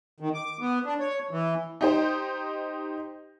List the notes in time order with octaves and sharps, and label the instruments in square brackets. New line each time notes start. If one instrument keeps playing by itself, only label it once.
[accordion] D#3
D6
B3
D4
C#5
E3
[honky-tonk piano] D#4 G4 C5